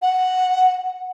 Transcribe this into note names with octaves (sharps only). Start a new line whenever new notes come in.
F#5